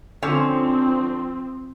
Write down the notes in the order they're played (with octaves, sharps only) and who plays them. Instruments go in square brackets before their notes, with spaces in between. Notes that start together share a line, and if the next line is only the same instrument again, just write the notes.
[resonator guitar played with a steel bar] D3 C#4 C5 [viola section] F3 C4